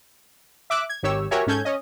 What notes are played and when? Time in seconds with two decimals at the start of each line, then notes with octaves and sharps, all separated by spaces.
0.70 E5 D6 E6 F#6
0.89 G#6
1.03 G#1 D#3 G4 C#5 E6
1.31 F#4 G4 A#4 C#5 E5 G#5
1.47 G#2 C#4 A4 G6 G#6
1.65 C#4 D#5